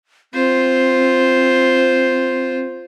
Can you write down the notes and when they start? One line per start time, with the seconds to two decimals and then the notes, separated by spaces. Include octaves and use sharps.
0.34 C4 F4 C5